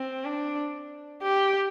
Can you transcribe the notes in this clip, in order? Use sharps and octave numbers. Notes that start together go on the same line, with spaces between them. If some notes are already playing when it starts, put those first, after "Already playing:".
Already playing: C4
D4
G4